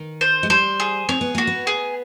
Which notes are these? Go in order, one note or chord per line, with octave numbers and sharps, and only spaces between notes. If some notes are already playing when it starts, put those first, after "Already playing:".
Already playing: D#3
C5
G#3
G3 C5
G#4
C4 C#5
B3
A#3 F#4
B3
G#4